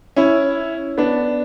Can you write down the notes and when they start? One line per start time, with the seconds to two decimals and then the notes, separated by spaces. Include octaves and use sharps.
0.16 C#4 E4
0.98 B3 D4